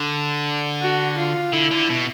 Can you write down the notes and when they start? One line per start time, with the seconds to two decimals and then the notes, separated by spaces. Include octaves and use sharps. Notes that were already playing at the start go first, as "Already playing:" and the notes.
Already playing: D3
0.82 F#4
1.18 F4
1.53 D3 E4
1.71 D3
1.89 B2